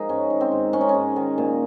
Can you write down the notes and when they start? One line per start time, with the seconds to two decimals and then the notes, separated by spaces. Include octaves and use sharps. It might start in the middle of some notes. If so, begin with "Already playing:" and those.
Already playing: F3 G#3 D#4 G#4 A#4
0.09 G#2 C#4
0.30 D#3
0.41 C4
0.52 G#2
0.73 G#3 C#4
0.81 D#4
0.89 C#4
0.94 G#2
1.16 D#3
1.38 A#2